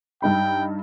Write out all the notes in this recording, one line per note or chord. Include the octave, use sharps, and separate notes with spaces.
G2 D#4 G5 B5